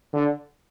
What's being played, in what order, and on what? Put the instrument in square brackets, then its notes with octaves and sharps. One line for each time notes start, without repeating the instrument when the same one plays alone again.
[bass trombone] D3